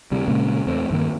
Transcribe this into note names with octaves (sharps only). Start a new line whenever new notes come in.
D2 C3 G3
A#2 C#3 G#3 A#3
E2 A3 C4
G2 D#3 A#3